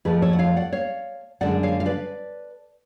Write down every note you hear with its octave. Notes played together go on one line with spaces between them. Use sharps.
F2 F3 A3 G#4 B4
A4 C#5
F#5
C#5 F5
D5 F#5
C#5 F5
F#2 D3 G#3 D5 F#5
C#5 F5
F5
B4 D5